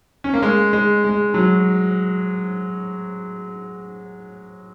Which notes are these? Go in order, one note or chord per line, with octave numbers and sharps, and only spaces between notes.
C#4
A#3
G#3
G#3
G#3
F#3